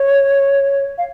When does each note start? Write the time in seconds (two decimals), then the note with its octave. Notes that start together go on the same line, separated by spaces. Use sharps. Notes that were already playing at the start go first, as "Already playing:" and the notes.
Already playing: C#5
0.98 F5